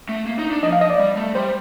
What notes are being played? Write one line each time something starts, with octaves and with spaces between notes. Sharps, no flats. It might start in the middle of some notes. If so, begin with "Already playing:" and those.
A3
A#3
D#4
D4
F3 D#5
F5
D#5
D5
G3
A3
G3 C5